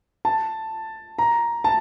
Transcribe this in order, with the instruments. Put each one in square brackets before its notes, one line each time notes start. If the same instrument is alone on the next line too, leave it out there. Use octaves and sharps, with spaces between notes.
[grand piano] A5
A#5
A5